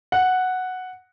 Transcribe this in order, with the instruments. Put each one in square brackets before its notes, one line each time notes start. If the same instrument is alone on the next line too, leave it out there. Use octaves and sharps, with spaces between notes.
[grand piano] F#5